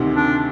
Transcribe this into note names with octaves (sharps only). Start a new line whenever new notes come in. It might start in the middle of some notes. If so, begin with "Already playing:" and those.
Already playing: D2 C3 D#3
D4